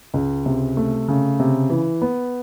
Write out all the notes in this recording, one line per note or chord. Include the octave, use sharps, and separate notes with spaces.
C#2
C3
A3
C#3
C3
E3
B3